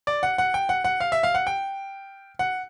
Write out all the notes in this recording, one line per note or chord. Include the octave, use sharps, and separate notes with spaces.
D5
F#5
F#5
G5
F#5
F#5
F5
E5
F5
F#5
G5
F#5